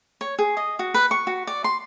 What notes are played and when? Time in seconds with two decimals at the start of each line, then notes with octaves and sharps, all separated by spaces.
0.21 C#5
0.39 G#4
0.57 D#5
0.79 F#4
0.94 B4
1.11 C#6
1.27 F#4
1.47 D5
1.64 C6